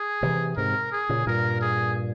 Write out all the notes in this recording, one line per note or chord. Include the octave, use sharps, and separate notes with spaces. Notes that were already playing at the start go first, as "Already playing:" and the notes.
Already playing: G#4
C3 E3
G#2 C3 A#4
G#4
A#2 C#3
G2 A#2 A#4
G#4